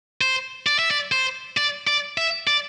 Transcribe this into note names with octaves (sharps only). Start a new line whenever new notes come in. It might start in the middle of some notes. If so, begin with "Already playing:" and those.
C5
D5
E5
D5
C5
D5
D5
E5
D5